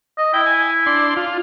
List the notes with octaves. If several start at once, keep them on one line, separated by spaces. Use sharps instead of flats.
D#5
E4 G5
G#5
D4 C6
F4